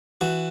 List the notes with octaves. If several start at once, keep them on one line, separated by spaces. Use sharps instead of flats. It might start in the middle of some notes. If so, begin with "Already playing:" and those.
E3 F#4